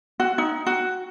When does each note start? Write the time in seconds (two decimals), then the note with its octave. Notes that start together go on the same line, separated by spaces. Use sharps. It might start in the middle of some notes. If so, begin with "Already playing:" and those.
0.20 F#4
0.38 D#4
0.66 F#4